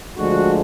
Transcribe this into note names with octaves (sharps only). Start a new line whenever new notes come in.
D2 D3 F3 G#3 F#4